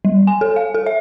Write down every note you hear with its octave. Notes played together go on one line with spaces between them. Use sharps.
G3
G#5
A4
F5
A4
E5